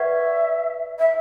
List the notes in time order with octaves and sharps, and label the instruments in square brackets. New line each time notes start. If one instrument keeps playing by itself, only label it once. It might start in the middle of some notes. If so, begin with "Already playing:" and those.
Already playing: [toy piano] B4 D5 F#5 C#6 [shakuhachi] E5
[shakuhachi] E5